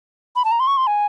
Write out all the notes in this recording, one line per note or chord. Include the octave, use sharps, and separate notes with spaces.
B5
A5
A#5
C6
C#6
C6
G#5